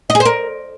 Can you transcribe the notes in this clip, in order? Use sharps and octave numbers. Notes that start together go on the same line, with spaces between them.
D#5
G#4
C5
A#4